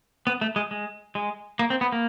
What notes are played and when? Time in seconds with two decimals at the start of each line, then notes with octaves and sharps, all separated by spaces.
0.27 B3
0.41 A3
0.56 G#3
0.71 G#3
1.15 G#3
1.59 A#3
1.70 C4
1.81 B3
1.92 A#3